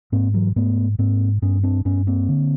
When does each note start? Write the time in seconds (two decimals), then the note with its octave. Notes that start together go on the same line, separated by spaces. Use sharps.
0.12 G#2 A#3 C4
0.34 E3 F#3
0.56 G#2 A3 B3
0.99 G#2 A#3 C4
1.42 G2 B3 C#4
1.63 C4 D4
1.85 G2 B3 C#4
2.07 A#3 C4
2.29 D3